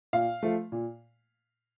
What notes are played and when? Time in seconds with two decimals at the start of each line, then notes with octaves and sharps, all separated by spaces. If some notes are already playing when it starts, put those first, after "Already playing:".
0.13 A#2 F5
0.43 F3 A3
0.72 A#2